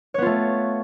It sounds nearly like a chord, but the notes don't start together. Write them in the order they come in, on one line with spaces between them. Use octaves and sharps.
C#5 B3 F4 A3